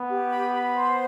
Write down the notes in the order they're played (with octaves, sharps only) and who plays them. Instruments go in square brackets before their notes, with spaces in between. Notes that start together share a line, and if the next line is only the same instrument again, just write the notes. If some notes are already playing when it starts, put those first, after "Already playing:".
Already playing: [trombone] B3
[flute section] G4
B5
B5
C5